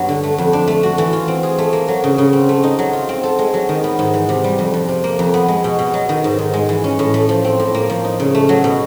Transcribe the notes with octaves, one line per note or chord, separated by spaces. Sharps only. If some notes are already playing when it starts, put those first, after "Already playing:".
Already playing: G2 F#3 B3
D3
A3
F2
D4
A3
F#4
E3
F4
C4
G#4
A3
A#3
F#3
C#3
C#3
C4
A3
D#4
F#3
F4
C4
A4
G#3
F#3
D#3
B3
G#2
E3
C3
G3
F2
F3
C3
A#3
F2
B3
G#3
B2
B2
F#3
D#3
G#2
G#2
G#3
E3
C#4
A2
A3
F3
C4
A2
A#3
F3
D#4
C#3
A3
F#3
B2